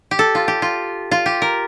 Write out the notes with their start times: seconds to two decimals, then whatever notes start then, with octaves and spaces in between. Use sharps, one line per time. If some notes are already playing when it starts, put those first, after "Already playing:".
0.11 G4
0.19 A4
0.35 F4
0.48 G4
0.62 F4
1.11 F4
1.26 G4
1.42 A#4